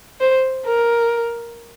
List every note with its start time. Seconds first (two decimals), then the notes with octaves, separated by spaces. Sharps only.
0.20 C5
0.65 A#4